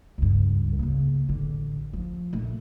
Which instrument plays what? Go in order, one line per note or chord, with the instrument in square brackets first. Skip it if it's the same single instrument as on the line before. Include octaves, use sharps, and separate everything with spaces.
[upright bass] C#2 G2
C#3 A#3
A1 D3
F3
A#1 A3